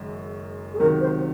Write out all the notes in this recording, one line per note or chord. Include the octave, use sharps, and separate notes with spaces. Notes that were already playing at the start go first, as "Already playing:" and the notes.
Already playing: F#1 F#2 D#3 G#3
G#4
C#2 C3 D#3 F#3 A#4
C5